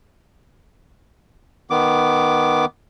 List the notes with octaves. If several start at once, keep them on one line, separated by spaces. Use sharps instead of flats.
D#3 B3 D6